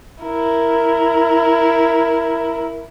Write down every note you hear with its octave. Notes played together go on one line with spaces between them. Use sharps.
E4 A#4